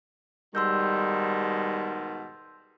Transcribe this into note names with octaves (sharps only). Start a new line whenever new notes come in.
G#2 B2 D#3 G3 C6 E6 G6